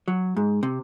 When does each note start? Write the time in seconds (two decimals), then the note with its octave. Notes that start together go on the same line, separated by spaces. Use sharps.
0.08 F#3
0.37 G#2
0.63 C3